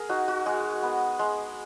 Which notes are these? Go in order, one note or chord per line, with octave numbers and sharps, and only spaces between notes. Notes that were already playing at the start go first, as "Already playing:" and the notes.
Already playing: G#4 A#4
D#4 F#4
F#4
G#3 G#4
B3
G#3